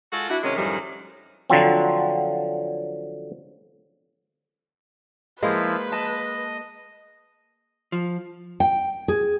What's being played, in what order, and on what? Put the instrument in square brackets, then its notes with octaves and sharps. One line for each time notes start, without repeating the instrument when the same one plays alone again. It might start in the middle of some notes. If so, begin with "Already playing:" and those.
[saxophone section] G#3 F4 F#4 A4
D4 E4 F#4
C3 D#3 G#3 C#4
F#2 A2 D#3 F3 G3
[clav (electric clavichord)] D3 F3 F#3 C4
[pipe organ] F3 E4 [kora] G#3 A#3 [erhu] B4 [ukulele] D#5
[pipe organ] D#5 [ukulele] A5
[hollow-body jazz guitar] F3
[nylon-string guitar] G5
G#4